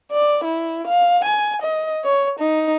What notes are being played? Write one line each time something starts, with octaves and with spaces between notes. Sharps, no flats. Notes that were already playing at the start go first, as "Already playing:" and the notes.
D5
E4
F5
G#5
D#5
C#5
D#4